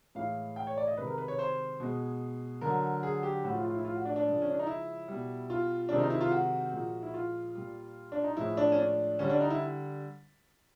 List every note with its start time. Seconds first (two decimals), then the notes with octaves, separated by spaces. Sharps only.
0.15 A2 E3 G#3 F5
0.56 G5
0.67 C#5
0.77 D5
0.87 D#5
0.97 C3 D#3 G#3 B4
1.07 A#4
1.18 B4
1.28 C#5
1.39 C5
1.80 B2 G#3
2.61 D3 F#3 A#4
3.03 G#4
3.23 G4
3.44 A2 F3 G#3 F#4
3.54 F4
3.65 F4
3.75 E4
3.85 F4
3.95 F#4
4.05 D4
4.16 D4
4.27 C#3 F3 G#3
4.42 C#4
4.50 D4
4.59 D#4
4.67 E4
5.08 B2 G3
5.50 F4
5.89 C3 D#3 G#3 D4
5.99 D#4
6.10 E4
6.21 F4
6.31 F#4
6.73 A#2 F3 G#3
7.03 E4
7.14 F4
7.55 A#2 G3
8.12 D4
8.24 D#4
8.37 A2 F3 G#3 E4
8.57 D4
8.72 C#4
8.79 D4
9.19 D3 G3 C#4
9.30 D4
9.40 D#4
9.50 E4